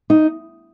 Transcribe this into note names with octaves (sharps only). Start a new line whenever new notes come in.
D#4